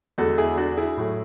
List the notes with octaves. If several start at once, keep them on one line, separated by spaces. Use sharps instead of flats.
E2 D3 G#3 F#4 A4
E4 G#4
D4 F#4
E4 G#4
A2 F#3 A3